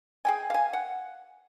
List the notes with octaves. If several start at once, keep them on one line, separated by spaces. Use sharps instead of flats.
G#4 G5 G#5
F5 G#5
F#5